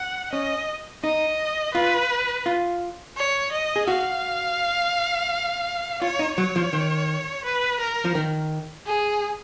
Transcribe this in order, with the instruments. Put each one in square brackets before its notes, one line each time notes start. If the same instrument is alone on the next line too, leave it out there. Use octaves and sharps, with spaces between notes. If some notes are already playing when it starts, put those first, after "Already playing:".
Already playing: [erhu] F#5
[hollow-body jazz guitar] C#4 [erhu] D#5
[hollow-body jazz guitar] D#4 [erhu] D#5
[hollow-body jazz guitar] F4 [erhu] B4
[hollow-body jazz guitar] F4
[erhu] C#5
D#5
[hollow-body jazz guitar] G#4
[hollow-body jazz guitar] F#4 [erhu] F5
[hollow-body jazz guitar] F4 [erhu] C#5
[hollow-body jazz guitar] D#4
[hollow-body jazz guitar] F#3 [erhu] C#5
[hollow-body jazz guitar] F3
D#3
[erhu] B4
A#4
[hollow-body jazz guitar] F3
D#3
[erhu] G#4